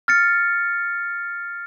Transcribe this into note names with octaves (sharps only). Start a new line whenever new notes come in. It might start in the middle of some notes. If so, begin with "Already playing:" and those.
F6 A6 C#7